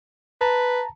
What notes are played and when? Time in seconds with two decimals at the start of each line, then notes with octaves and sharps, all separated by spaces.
0.41 B4 A5 A#5